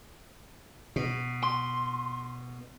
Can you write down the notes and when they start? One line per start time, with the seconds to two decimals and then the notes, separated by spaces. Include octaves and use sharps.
0.96 B2
1.43 C6